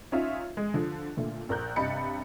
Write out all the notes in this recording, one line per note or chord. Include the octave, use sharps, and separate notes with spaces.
C#4 D#4 F4 E5 F5
G#3
D3 F3
A#2 D3 A3
A#1 A#3 A#5 F#6 G6
G2 C3 D#5 B5 A6 C#7